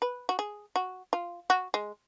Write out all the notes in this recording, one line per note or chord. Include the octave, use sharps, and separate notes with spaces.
B4
F#4
G#4
F#4
F4
F#4
G#3